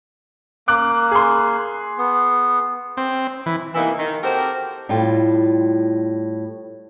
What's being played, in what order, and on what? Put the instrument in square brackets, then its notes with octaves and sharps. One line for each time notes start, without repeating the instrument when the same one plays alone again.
[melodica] A#3 [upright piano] D6 F#6
[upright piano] G#4 C6
[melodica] B3
[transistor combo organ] C4
E3
[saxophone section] C3 E3 A#3 B3 D#4 E4
D#3
C4 F#4 G4 A4 A#4 C5
[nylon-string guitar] A2 G3 F4